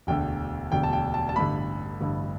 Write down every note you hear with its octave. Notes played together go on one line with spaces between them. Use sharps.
E1 D2 D3 G5
E1 D2 D3 G5
A5
G5
A5
A5
A1 G2 D3 B5
A1 G2 D3